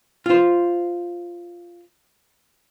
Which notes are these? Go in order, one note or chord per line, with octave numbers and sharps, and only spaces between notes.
F4 C5